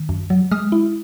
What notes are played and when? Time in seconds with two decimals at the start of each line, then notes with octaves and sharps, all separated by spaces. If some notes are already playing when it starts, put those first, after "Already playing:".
Already playing: D#3
0.09 F#2
0.30 F#3
0.51 G#3 D#6 F6
0.72 E4